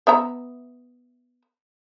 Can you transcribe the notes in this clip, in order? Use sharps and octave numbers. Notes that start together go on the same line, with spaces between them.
B3 E5 A#5